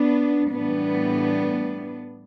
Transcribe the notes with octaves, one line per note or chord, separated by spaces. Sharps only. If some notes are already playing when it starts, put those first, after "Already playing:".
Already playing: B3 D4
A2 E3 G3 B3 D4